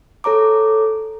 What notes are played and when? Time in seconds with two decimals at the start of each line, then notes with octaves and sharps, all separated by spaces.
0.24 A4 C#5 A#5 D6